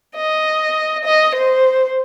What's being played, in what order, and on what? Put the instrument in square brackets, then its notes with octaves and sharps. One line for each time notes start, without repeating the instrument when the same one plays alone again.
[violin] D#5
D#5
C5